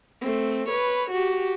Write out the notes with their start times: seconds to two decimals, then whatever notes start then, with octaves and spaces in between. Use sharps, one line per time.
0.21 A3 C4
0.69 B4 C#5
1.11 F#4 G4